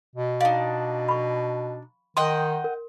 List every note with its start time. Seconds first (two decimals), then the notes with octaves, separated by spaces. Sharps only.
0.15 B2
0.41 D4 D#4 F5
1.09 B5 C#6
2.17 D#3 D#5 F#5 G5 C6
2.64 A#4